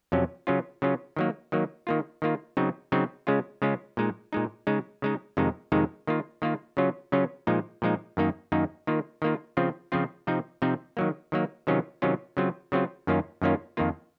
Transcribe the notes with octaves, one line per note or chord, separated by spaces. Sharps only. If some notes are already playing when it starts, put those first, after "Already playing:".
F2 C3 F#3 C#4
C#3 F#3 C#4 F4
C#3 F#3 C#4 F4
D#3 F#3 A#3
D#3 F#3 A#3
D#3 A#3 F4
D#3 A#3 F4
C#3 F#3 C4 D#4
C#3 F#3 C4 D#4
C#3 G#3 C#4 F4
C#3 G#3 C#4 F4
A#2 G#3 D#4
A#2 G#3 D#4
C#3 G#3 D#4
C#3 G#3 D#4
F2 C3 D#3 G#3 D#4
F2 C3 D#3 G#3 D#4
D#3 A#3 F4
D#3 A#3 F4
C#3 F#3 C#4 F4
C#3 F#3 C#4 F4
A#2 F3 G#3 D#4
A#2 F3 G#3 D#4
F#2 D#3 A#3 D#4
F#2 D#3 A#3 D#4
D#3 A#3 F4
D#3 A#3 F4
C#3 F3 C4 F4
C#3 F3 C4 F4
C3 F3 C4 D#4
C3 F3 C4 D#4
D#3 F#3 A#3
D#3 F#3 A#3
C3 D#3 F#3 C#4 F4
C3 D#3 F#3 C#4 F4
C#3 F#3 C4 F4
C#3 F#3 C4 F4
F#2 D#3 A#3 C#4 F4
F#2 D#3 A#3 C#4 F4
F2 D#3 A#3 F4